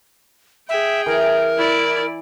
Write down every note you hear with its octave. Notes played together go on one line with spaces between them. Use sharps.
G#4 E5 G5
E3 A#4
E4 D5